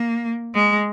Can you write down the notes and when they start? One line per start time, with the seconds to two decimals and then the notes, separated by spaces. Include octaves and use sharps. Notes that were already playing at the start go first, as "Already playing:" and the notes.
Already playing: A#3
0.54 G#3